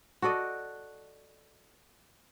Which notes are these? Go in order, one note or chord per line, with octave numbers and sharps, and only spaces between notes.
F#4 A4 D5 D#5